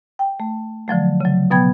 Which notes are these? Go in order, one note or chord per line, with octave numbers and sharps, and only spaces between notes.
G5
A3
D3 F3 F#3 A3
C#3 F#3
B2 F#3 B3 G5 B5 G#6